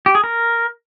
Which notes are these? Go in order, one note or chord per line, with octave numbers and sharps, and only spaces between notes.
G4
G#4
A#4